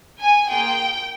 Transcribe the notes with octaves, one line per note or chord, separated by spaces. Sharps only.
G#5
A#3 F4 G#4 G5